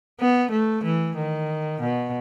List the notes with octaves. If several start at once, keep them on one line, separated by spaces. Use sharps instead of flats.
B3
A3
E3
D#3
B2